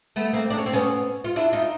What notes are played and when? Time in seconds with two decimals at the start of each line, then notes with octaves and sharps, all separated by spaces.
0.16 A3 B3
0.33 A#3 C4
0.50 D4
0.58 C#4
0.66 C4
0.73 B3 C#4
1.24 F4
1.36 D4 E4
1.53 D#4 F4